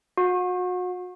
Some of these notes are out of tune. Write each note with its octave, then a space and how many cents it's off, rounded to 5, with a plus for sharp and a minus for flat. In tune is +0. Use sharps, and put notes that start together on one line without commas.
F#4 -35